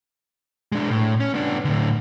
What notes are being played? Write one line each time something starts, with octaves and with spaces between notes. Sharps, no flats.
G#3 D4
A2
C#4
B3 D4
A2 D3